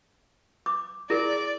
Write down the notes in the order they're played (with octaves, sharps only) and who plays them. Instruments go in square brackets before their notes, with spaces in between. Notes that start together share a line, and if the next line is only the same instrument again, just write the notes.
[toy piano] D6
[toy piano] E4 G#4 A#4 [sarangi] D5